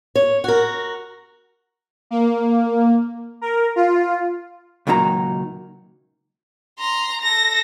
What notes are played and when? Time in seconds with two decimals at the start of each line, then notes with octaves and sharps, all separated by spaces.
0.16 C#5
0.44 F#4 A#4
2.11 A#3
3.41 A#4
3.76 F4
4.87 C#2 A#2 D#3 F#3 A#5
6.79 A#5 C6
7.21 A4 A#6